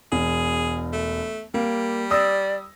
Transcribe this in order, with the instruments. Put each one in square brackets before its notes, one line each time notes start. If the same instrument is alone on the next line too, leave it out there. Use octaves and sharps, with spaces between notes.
[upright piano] E1 [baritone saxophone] G#4
[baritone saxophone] A3
[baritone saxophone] G3 [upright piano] A#3
[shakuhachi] D5 [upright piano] D#6 E6 A#6